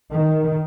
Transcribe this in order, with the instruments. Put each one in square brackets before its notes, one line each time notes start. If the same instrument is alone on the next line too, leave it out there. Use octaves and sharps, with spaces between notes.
[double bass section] D#3